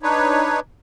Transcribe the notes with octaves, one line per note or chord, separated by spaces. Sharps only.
D4 D#4 B4 C#5